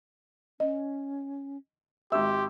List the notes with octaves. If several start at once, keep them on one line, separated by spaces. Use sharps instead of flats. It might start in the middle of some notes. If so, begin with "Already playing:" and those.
C#4 D#5
G#1 G4 E5 C6 E6